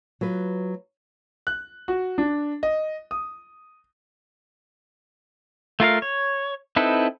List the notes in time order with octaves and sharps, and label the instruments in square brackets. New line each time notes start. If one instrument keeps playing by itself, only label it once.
[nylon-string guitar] F#3 F4 B4
[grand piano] F#6
F#4
D4
D#5
D#6
[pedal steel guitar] A3 F4 A#4 F5
C#5
C4 D#4 E4 A4 B4